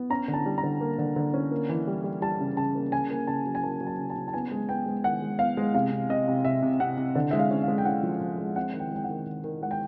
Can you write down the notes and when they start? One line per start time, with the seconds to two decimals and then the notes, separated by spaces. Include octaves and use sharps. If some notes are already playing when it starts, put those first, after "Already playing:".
Already playing: B3
0.10 C#4 A#5
0.28 D3
0.34 A5
0.46 G3
0.58 A#5
0.63 D3
0.81 A#3
0.98 D3
1.16 D3
1.34 C#4
1.52 A#3
1.69 E3
1.87 G3
2.04 G3
2.22 G3 A5
2.40 C#3
2.57 C#3 A5
2.75 A#3
2.92 C#3 G#5
3.10 A#3
3.27 C#3 A5
3.46 F#3
3.55 G#5
3.63 A#3 A5
3.81 F#3
3.87 A5
3.98 C#3
4.10 A5
4.16 C#3
4.28 A5
4.33 B3 G#5
4.51 G#3
4.69 B3 G5
4.86 G#3
5.04 D#3 F#5
5.22 G#3
5.39 B3 F5
5.57 G#3
5.74 C3 F5
5.92 C3
6.10 C3 D#5
6.28 C3
6.45 C3 E5
6.63 C3
6.80 C3 F#5
6.98 C3
7.15 D3
7.31 G#3 E5
7.39 F5
7.51 C#4
7.63 F5
7.68 G#3
7.78 G5
7.85 C#4 F#5
8.03 F3
8.21 F3
8.38 G#3
8.56 C4 F#5
8.74 D#3
8.80 G5
8.91 G#3 G5
9.04 F#5
9.10 D#3
9.26 D#3
9.44 D#3
9.62 G#3 F#5
9.71 G5